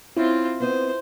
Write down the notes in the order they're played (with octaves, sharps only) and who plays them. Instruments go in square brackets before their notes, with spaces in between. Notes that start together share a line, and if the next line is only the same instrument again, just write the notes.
[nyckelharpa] C4 F4 [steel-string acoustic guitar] C#4 [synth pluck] E4
[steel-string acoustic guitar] B3 C4 D#5 [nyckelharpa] C5